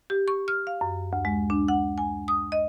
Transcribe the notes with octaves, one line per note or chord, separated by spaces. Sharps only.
G4
C#6
F6
F5
F#2
D2
G#3
D4
F#5
G#5
D#6
D#5